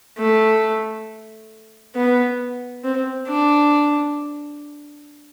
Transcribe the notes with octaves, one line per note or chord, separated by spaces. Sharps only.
A3
B3
C4
D4